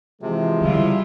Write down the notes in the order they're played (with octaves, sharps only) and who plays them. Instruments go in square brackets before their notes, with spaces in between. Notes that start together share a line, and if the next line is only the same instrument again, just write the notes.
[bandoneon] C3 [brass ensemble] E3 F3 G#3
[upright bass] D3 C#4 [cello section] G3 E4 F4